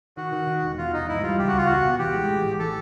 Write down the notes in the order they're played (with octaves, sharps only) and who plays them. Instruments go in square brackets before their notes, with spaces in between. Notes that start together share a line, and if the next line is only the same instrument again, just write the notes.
[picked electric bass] D#3 [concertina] F#4
[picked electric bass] D#3
D#3
E1
[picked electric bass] E2 [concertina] F4
[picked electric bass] F1 [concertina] D#4
[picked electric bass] G#2 [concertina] E4
[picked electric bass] G3 [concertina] F4
[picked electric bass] C#2 [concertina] G4
[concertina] F#4
[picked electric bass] C#2 [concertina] F4
[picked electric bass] E2 [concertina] F#4
[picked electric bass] B2
[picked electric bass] E3 [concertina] G4
[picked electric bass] G#3
A1
A1
[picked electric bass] E3 [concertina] A4